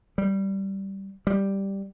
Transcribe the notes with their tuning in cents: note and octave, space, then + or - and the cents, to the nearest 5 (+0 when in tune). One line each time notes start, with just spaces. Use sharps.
G3 -10
G3 +0